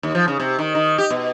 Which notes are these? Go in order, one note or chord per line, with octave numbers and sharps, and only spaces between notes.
D#2
F3
C#3
C3
D#3
D#3
G4
B2